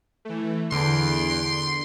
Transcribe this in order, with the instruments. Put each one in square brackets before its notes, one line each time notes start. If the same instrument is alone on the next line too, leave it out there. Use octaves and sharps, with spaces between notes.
[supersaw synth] E3 A3
[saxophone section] E2 [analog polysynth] D3 [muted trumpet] C6 [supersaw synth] D7